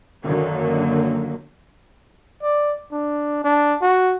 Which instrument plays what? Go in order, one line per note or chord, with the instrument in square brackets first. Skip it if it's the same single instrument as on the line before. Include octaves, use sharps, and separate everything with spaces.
[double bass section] F#2 D3 D#3 F#3 A#3
[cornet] D5
D4
D4
F#4